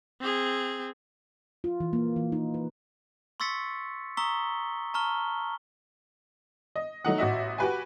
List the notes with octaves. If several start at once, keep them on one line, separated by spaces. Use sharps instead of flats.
C4 G#4
F4
E3
A#3
E3
D#4
B4
C6 C#6 E6 A6 B6 C#7
A#5 C#6 D#6 E6 B6 G7
A5 A#5 C#6 F6 G7
D#5
F#3 A3 D#4 F#5
A1 F#4 D#5 E5
F#4 G4 B4 G#5